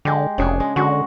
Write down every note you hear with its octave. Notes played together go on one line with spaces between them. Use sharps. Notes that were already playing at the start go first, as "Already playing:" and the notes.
D3 G#3 G4
F1 C#3 D4 G#4
G#3
D3 G#3 F#4 F#5